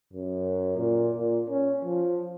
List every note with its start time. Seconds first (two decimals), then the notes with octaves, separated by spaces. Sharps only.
0.13 F#2
0.77 A#2
1.18 A#2
1.49 C#4
1.84 F3